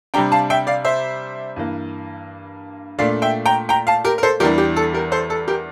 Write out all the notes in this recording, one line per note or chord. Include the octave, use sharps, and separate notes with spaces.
C3 G3 D4 G5 A#5
F5 A5
E5 G5
D5 F5
C5 E5
G2 E3 A#3
A#2 A3 D4 D5 F5
E5 G5
G5 A#5
G5 A#5
F5 A5
G4 A#4
A#4
A4 C5
E2 E3 G3 D4 G4 A#4
G4
A4
G4 A#4
A4 C5
A4
G4 A#4